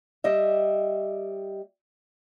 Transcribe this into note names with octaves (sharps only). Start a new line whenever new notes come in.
G3 D#5 E5